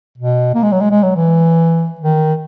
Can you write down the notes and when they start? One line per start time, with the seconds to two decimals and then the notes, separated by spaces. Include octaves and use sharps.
0.18 B2
0.55 A#3
0.63 G#3
0.72 F#3
0.81 G#3
0.91 G#3
1.03 F#3
1.15 E3
2.01 D#3